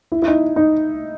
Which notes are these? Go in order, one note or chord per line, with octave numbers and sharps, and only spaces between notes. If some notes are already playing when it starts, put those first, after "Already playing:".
E4
E4
D#4
D#4